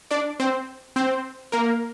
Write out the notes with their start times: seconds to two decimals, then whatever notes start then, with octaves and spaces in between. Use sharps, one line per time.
0.11 D4 D5
0.40 C4 C5
0.96 C4 C5
1.52 A#3 A#4